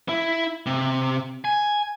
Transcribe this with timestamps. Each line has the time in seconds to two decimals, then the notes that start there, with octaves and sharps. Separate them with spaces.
0.09 E4
0.66 C3
1.45 G#5